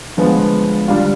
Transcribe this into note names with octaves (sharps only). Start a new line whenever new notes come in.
G1 G2 F3 G#3 B3
D3 G3 D4 F4